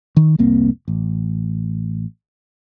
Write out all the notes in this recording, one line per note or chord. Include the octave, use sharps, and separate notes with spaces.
D#3
F1 C2 A#3 C4
A1